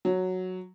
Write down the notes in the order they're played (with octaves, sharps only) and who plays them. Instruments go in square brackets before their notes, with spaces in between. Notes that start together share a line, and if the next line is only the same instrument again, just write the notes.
[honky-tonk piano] F#3